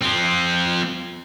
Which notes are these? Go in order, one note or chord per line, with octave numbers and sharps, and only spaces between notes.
F3 C4